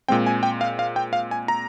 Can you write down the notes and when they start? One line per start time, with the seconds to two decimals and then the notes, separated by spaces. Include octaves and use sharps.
0.08 A#2 G#3 C4 G5
0.26 G#5
0.43 G5
0.61 F5
0.79 F5
0.96 G5
1.13 F5
1.31 G#5
1.48 A#5